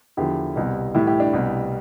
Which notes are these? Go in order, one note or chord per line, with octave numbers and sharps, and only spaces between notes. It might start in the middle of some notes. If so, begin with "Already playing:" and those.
E2 D3 F3 E4 G4
C2 B2 G3
A2 E3 G3 E4 G4
E4 G4
D4
C2 B2 G3